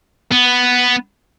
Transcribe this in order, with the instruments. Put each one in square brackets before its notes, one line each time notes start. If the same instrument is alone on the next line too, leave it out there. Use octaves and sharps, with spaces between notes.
[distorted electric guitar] B3